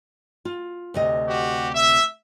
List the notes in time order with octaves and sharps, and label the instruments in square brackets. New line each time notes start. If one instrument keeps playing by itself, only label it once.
[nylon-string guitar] F4
D2 C3 D#5
[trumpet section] F#4 G4
E5